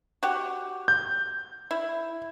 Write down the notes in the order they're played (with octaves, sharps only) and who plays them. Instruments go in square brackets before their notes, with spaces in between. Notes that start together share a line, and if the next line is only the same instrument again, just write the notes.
[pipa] F#4 G4
[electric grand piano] G6
[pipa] E4